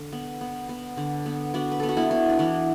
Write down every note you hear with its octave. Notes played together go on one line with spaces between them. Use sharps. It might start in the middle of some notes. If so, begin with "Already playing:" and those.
Already playing: D3
B3
B3
B3
D3
B3
B3 D4 F#4
B4
B3 A4
F#4
B3 E4
B3
D4
E3 B3